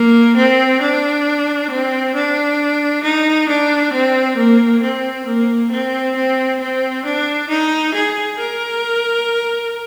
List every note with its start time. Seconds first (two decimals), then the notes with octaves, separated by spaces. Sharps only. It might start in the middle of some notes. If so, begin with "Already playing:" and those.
Already playing: A#3
0.36 C4
0.81 D4
1.70 C4
2.15 D4
3.03 D#4
3.48 D4
3.93 C4
4.37 A#3
4.82 C4
5.26 A#3
5.71 C4
6.16 C4
6.60 C4
7.05 D4
7.49 D#4
7.94 G#4
8.39 A#4